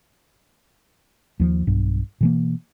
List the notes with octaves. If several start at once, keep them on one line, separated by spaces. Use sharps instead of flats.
D#2 F3
B1 G2
B2 E3 A#3